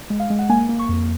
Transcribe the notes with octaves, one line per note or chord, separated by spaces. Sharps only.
G#3
F5
G#3
F#5
A#3 G#5
A#3
C#6
F2